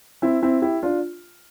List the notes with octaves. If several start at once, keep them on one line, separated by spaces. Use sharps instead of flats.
C4 E4
C4 E4
E4 G4
D4 F4